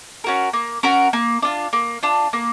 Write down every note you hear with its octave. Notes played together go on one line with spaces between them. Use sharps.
C#4 F#4 A#4
A#3
C#4 F#4 A#4
A#3
D4 F4
A#3
D4 F4
A#3